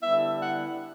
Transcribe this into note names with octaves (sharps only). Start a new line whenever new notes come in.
D3 G3 B3 E4 E5
F#5